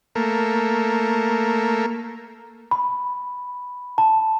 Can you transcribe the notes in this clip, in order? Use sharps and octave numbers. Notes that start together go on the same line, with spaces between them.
A3 A#3
B5
A5